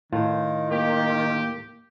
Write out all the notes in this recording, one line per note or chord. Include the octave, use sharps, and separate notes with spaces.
A2 D#3 F4
A#3 G4